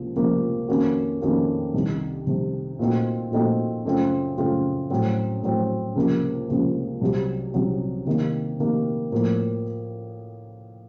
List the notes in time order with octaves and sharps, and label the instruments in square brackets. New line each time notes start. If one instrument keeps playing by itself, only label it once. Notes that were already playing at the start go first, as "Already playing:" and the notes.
Already playing: [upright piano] C#2 C3 F3 A#3
C#2 C3 F3 A#3
F2 D#3 A#3 C#4 F#4
F2 D#3 A#3 C#4 F#4
C2 C3 D#3
C2 C3 D#3
A#2 A3 C4 D#4 F#4
A#2 A3 C4 D#4 F#4
F#2 C#3 A3 C4 F4
F#2 C#3 A3 C4 F4
A2 F#3 C4
A2 F#3 C4
C#2 C3 F3 A#3
C#2 C3 F3 A#3
C2 C3 F#3
C2 C3 F#3
C3 D#3 A#3
C3 D#3 A#3
A2 F3 A#3